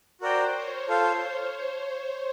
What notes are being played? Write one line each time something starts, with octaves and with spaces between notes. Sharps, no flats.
F#4 A#4 C5 D5 G5
C#5
F4 A4 C5 F5